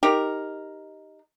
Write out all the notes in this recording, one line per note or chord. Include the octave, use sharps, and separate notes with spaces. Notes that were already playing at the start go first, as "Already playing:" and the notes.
D#4 G4 A#4